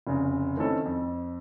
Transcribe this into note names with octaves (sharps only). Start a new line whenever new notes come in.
F1 C#3
D#3 A3 C4 C#4 E4 A4
F2